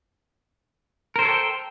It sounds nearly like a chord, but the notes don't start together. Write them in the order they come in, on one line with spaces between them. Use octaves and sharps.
A#4 C5 A4 C#5 G5